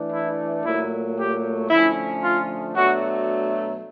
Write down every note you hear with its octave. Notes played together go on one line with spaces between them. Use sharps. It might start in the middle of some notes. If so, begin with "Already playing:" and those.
Already playing: E3 A3 D4
E4
A#2 F#3 A3 E4
G4
D3 F3 A3 C#4 E4
F4
B2 F#3 A3 D4 F#4